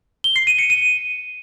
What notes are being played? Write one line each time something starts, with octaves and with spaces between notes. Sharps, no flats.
G7
C7
D#7
C#7
D#7